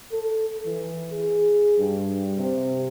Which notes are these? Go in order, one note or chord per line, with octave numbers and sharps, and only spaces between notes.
A4
E3
G#4
G2
C3